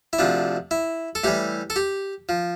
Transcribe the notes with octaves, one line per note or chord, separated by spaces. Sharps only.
E4
D2 C3 F3 D4
E4
A4
A2 E3 G3 G4
A4
G4
F3